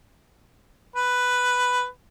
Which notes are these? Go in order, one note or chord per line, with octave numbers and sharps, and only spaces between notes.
B4